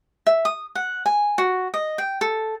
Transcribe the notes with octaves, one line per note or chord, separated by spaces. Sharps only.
E5
D#6
F#5
G#5
F#4
D#5
G5
A4